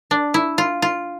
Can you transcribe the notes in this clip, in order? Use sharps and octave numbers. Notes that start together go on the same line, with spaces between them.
D4
E4
F4
F4